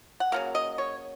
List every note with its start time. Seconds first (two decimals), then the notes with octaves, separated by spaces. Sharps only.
0.20 F#5
0.32 C#3 F#3 A#3 F5
0.55 D#5
0.78 C#5